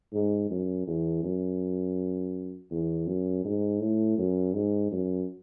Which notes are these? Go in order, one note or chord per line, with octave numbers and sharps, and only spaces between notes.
G#2
F#2
E2
F#2
E2
F#2
G#2
A2
F#2
G#2
F#2